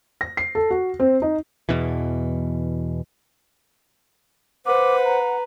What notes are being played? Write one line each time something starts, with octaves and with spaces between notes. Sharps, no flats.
A#6
C7
A4
F#4
C4
D#4
E2 B2 E3
B4 C5 F#5 D6
A#5